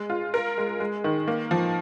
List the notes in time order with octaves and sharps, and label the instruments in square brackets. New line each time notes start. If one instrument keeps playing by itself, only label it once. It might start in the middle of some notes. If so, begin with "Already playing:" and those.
Already playing: [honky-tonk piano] G#3
F4
A#4
G#3
G#3
D#3
A#3
F3